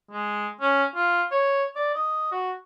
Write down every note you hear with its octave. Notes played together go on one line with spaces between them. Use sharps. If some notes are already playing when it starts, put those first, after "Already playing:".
G#3
C#4
F4
C#5
D5
D#5
F#4